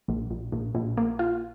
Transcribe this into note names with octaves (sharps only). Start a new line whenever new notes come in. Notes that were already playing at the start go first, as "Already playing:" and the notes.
A#1
A#1
A#1
A#1
A#3
F4